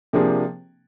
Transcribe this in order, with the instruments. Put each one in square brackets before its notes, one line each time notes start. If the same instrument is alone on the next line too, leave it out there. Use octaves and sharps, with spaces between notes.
[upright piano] C3 F3 A#3 D4 G#4